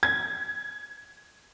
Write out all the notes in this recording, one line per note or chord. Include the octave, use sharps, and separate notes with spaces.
G#6